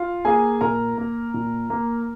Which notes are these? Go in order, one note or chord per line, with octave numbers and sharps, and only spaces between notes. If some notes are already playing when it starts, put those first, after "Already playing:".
Already playing: F4 F5
A#3 G#4 G#5
A#2 A#4 A#5
A#3
A#2
A#3